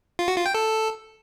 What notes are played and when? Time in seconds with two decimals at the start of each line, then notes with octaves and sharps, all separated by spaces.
0.19 F4
0.28 F#4
0.37 F4
0.46 G5
0.54 A4